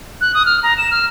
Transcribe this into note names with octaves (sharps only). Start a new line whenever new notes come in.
F#6
D#6
F6
A#5
E7
F6